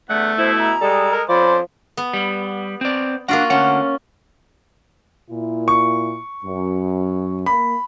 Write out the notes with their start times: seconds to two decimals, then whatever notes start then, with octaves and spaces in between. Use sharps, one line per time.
0.10 E2 D3 A3 F#5
0.38 B2 E4 C5
0.59 A#5
0.82 G3 G#3 A4
1.12 A#4
1.29 F2 F3 C#4 C5 D5 B5
1.97 B3
2.13 G3
2.81 C4 D5
3.28 A#3 D4 F4 F#4 F#5
3.50 D2 D3 C#4 F#5
5.29 A#2 E4
5.68 C#6
6.44 F#2
7.46 A#3 B5